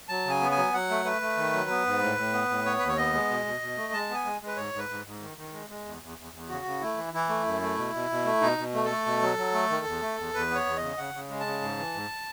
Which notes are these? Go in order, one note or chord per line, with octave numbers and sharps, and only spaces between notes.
F#3 A5
C#3 G#5
B3
G#5
F#3
F#3 F#5
A3
A3 B4
A3
D#3
F#3
B3
G#2
A2
A2
B3
A2
B3 C#5
D#2 B4
C#5
B3 D#5
G#3
B2
B2
B2
A3
G#3 A5
B3 G#5
G#3
G#3
B4
G#2 C#5
G#2
B4
G#2
G#2
D#3
D#3
G#3
G#3
E2
E2
E2
E2
C#3 F#4
C#3
A3 E4
E3
E3 E4
A3
F#2
A3
B2
B2
B2
A3
B2 D#4
B2
A3
A4
A3
B2
F#3
F#3
A3
D#3
E2
A3
E2
E2 B4
B3 C#5
E2
C#3 D#5
C#3 F#5
C#3
G#3
A5
C#3
G#2
E3
G#2